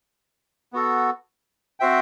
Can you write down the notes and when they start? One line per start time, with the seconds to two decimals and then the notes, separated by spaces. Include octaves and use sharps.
0.73 B3 F#4 A4
1.80 C4 F#4 C5 E5 G5